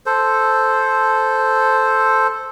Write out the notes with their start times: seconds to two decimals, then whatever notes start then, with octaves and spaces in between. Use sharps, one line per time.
0.06 A4 C5